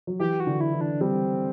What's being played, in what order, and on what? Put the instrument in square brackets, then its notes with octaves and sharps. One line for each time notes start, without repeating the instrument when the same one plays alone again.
[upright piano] F#3
[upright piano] E3 [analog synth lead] G4
[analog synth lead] F#4
[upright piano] D3
[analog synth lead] E4
[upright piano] E3
[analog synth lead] D4
[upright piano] G3 [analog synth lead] C4